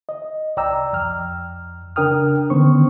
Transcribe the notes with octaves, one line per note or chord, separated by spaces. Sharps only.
D#5
C2 D5 G5 A#5 E6
F2 F6
C#3 D4 A#4 G5 D#6 F6
D3 D#3 B3 C#4 C5 C#6